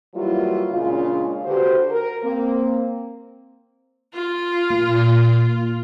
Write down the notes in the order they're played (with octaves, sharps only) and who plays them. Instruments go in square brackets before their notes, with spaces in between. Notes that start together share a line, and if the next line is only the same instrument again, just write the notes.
[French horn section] E3 F#3 G3 A#3 E4 F4
A#2 C#3 G#3 D4 F4
D3 F#4 G4 B4 C5
A#4
A#3 C4
[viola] F4
[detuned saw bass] A#2